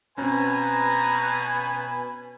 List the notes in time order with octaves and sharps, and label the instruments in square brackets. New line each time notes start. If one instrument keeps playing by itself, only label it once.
[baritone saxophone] B2 [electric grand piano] C4 C#4 [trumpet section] B4 G#5 B5 [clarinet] A#5